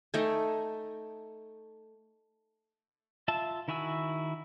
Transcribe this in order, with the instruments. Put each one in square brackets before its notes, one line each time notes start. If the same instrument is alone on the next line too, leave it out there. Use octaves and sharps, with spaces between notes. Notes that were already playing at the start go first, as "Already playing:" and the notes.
[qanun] A3 D#4 G5 G#5
[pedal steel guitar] F4 E5 A5
D#3 E4 F#4 G#5 E6